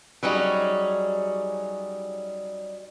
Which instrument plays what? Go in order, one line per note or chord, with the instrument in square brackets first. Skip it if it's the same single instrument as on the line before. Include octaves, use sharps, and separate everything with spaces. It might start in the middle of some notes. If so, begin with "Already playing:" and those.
[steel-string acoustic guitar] F#3 G3 C#4 D#4 G#4